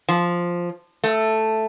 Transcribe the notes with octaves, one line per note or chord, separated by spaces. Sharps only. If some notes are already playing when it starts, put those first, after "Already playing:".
F3
A3